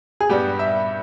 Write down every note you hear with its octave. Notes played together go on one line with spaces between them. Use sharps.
G#4
G2 G3 B3 G4
E5